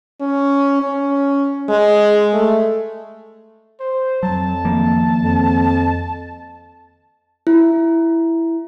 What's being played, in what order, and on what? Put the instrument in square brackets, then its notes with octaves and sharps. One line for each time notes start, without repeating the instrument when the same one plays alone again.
[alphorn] C#4
C#4
G#3
A3
[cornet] C5
[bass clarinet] F2 [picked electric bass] F#3 [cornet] A5
[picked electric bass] D#3 F3 A#3
[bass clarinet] F2
[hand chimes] E4